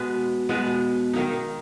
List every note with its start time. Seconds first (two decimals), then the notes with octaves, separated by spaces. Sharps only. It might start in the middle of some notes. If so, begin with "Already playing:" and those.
Already playing: B2 G#3 B3
0.49 B2 G#3 B3
1.13 D#3 A#3 D#4